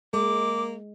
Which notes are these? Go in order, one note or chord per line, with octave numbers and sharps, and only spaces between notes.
G#3 A#3 D6